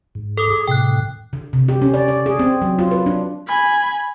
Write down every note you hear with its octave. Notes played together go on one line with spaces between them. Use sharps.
G#2
A4 D6 D#6
G#4
A2 C3 G5 F#6
D3
C3
G4
C#4
D5
D5
G#4
C4
F#3
F4
B4
D4
G#5 B5